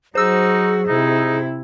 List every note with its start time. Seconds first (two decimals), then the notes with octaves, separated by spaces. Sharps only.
0.15 F#3 D#4 F#4 G#4 C5 E6
0.88 C3 D#4 E4